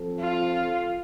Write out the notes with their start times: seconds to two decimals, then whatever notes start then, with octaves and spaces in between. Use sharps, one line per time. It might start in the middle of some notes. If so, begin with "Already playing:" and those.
Already playing: F3 C4 A4
0.20 F4